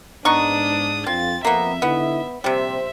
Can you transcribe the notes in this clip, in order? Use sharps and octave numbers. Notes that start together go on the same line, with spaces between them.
G#2 B3 D4 D#4 C#6 D#6
F2 C4 F4 A6
F2 A#3 B3 E5
D3 B3 D#4 E4
A#1 C3 G3 G4 C5 E5